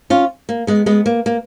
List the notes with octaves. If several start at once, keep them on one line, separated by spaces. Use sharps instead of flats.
C#4 F4
A#3
G#3 B3
G#3 B3
A#3
A#3